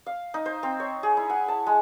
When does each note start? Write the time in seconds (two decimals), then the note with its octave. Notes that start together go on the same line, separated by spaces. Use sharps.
0.06 F5
0.34 D#4
0.46 C5
0.63 C4
0.80 C#5
1.03 G#4
1.17 E4
1.30 F#5
1.48 A5
1.67 G#3